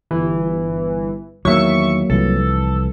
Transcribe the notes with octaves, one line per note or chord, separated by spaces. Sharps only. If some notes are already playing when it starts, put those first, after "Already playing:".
G1 E3
E2 D#3 F#3 A#3 E5 C#6
C2 E3 F3 A4